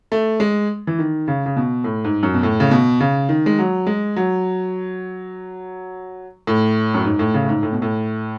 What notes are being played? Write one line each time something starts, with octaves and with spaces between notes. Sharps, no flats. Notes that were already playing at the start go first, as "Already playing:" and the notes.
A3
G#3
E3
D#3
C#3
C#3
B2
A2
G#2
F#2
B2
A2
C#3
B2
C#3
D#3
G#3
F#3
G#3
F#3
A2
F#2
G#2
A2
C#3
A2
G#2
A2
B2
A2